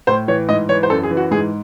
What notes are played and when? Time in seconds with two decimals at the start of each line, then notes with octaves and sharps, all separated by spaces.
0.07 A2 C5
0.28 E3 C#5
0.49 G#2 D#5
0.69 E3 C#5
0.83 C5
0.90 F#2 A4
1.03 G#4
1.11 E3
1.17 F#4
1.31 G#2 G#4